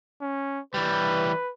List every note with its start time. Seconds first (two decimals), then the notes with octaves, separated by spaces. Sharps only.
0.21 C#4
0.74 E3 G3 B4